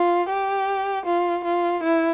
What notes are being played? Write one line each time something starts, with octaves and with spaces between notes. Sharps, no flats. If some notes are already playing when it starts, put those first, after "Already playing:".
Already playing: F4
G4
F4
F4
E4